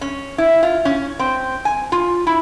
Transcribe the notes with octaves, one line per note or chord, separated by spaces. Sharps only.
C#4
E4
F4
C#4
C4
G#5
F4
E4